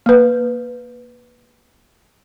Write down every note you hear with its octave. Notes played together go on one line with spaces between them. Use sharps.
A#3 B4